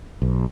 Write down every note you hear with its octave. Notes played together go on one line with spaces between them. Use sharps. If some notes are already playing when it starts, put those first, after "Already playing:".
B1